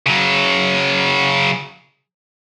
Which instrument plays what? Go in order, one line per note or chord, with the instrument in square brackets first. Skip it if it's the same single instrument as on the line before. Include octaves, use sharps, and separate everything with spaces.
[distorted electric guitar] C#3 F#3